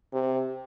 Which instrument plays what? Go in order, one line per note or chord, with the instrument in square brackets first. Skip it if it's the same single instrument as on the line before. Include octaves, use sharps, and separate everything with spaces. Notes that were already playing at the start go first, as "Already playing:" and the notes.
[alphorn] C3